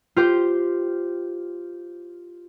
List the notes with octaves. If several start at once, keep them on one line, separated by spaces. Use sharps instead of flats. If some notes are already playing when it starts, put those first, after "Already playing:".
F4 G4 C5